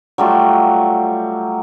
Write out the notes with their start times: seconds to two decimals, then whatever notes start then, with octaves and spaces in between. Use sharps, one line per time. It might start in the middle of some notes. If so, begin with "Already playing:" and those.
0.18 F#3 G3 A3 F4